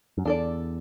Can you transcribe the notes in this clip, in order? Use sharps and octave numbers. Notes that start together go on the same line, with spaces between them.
F#2
E2 D4 A4 D5